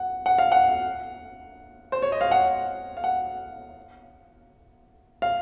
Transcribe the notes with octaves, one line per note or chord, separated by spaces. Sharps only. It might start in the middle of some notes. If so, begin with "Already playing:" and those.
Already playing: F#5
F#5
F5
F#5
C5
C#5
D#5
F5
F#5
F5
F#5
F5